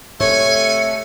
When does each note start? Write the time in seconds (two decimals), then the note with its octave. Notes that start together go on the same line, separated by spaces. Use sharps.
0.21 C3 A3 C#5 G#5 C#7